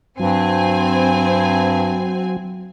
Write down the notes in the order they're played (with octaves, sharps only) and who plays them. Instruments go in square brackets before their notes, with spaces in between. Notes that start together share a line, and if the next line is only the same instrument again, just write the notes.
[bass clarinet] G2 [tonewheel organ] F#3 [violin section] C4 G#5